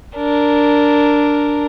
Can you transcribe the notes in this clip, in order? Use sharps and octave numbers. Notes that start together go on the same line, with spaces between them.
D4 A#4